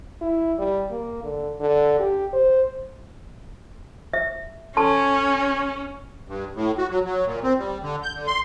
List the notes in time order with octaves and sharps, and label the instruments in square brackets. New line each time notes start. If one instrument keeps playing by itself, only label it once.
[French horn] E4
G3
A#3
D3
D3
G4
C5
[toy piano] E5
[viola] C#4 [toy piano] A4 A5 C6
[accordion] G2
A2
F#4
F#3
F#3
A#2
C4
G3
D3
G6
D3
C6